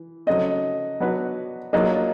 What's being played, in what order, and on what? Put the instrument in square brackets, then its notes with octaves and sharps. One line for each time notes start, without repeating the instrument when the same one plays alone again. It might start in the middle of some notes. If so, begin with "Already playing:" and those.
Already playing: [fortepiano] E3
[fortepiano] C#3 F#3 A3 C4 [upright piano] D#5
[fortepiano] F#3 B3 D4 F#4 B4
[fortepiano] F#3 A#3 D4 F4 G#4 [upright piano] D#5